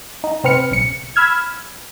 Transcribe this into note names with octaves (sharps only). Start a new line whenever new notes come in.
D#4
C3 C4 B4 F6 C#7
B1 C#3 C#7
B5 E6 F6 G#6